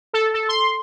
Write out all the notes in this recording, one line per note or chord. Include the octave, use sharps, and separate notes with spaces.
A4
A4
C6